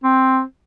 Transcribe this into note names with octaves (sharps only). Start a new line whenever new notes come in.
C4